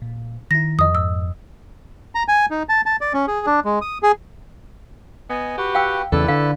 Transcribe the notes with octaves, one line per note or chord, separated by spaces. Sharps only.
A#2
D#3 E4 A#6
F2 D#5 D#6
G#2 E6
A#5
G#5
D#4
A5
A5
D5
C#4
G#4
D4
G#3
D#6
G#4
B3 D#5 G#5
F#4 G4 B4 F#5
F5 G5 E6
E2 C#3 E4 A4 B4 D5
D3 A4 F5